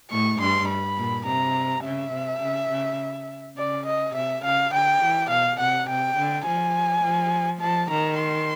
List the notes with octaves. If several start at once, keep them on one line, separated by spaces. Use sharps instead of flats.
A2 C#6
G2 C6
B5
A#2
C3 A#5
C#3 E5
C3
C#3
C#3
C#3 D5
D#5
C3 E5
C#3 F5
D3 G5
E3
B2 F5
C3 F#5
C3 G5
D3
F3 G#5
F3
F3 A5
D#3 A#5
C6